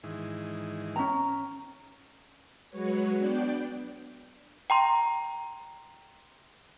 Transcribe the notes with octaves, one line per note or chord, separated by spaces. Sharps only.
G#2 D#3 E3
C#4 A#5
F#3 G#3 F#4 B4 C#5
B3 D4 D5 G5
G5 A#5 C6